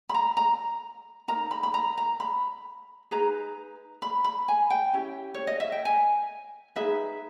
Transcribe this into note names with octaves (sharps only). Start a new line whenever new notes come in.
B5
A#5
A#5
D#4 A#4 A#5
B5
B5
A#5
A#5
B5
D#4 G#4 B4 A#5
B5
B5
G#5
G5
C#4 E4 G4
C#5
D#5
E5
G5
G#5
D#4 G#4 B4 E5